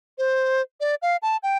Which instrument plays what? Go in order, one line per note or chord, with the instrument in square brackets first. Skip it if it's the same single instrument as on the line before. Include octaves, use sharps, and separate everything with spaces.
[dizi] C5
D5
F5
A5
G5